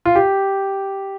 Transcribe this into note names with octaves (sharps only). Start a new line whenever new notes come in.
F4
G4